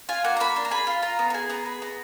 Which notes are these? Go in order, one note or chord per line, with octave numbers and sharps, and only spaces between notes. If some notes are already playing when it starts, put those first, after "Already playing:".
F4 G#5
A#3 F#5
A#5
A#3 B5
D4
A#5
G#4 B5
F4
F4 A#5
B3
A#5
G#4 G#5
B3 A#5
G#4 B5
B3 A#5